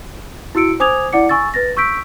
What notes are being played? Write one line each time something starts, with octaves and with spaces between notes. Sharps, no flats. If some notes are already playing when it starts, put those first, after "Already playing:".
E4 F#4 E6 C#7 D7
C5 G#5 D6 D#6 G#6 F7
E4 D5 F#5 D6 C#7
G#5 C#6 E6 A6
B4 A6 A#6
C#6 E6 G6 B6 D7